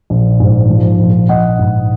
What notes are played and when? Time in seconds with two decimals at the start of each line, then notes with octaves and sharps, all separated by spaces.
0.10 A#1
0.40 G#2
0.70 F3
0.99 A#1
1.29 A#1 D#5 F#5
1.59 G#2